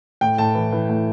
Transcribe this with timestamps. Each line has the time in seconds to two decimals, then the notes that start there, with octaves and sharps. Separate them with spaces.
0.21 A2 G5
0.38 A2 A5
0.55 E3
0.72 E3
0.89 A2